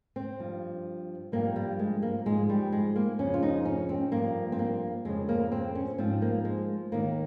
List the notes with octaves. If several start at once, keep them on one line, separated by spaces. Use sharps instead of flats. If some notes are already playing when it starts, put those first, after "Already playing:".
C4
G2 F3
G2 F3 A#3
G3
G#3
A#3
G#2 F3 G#3
G3
G#3
A#3
F2 C#3 F3 C#4
F4
D#4
C#4
C4
G2 F3 A#3
C4
A#3
F2 C#3 F3 G#3
A#3
C4
C#4
G#2 F3 C4
A#3
G#3
D#2 D#3 A#3